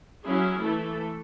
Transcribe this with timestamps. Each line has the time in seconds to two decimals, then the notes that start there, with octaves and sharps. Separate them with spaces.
0.24 F#3 C#4 E4 G#4
0.60 E3 A3 A4